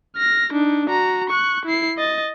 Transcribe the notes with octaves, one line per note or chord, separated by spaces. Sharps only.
F6 A#6
D4 D#4
F#4 A#5
C#6 F#6
E4 C7
D#5 A6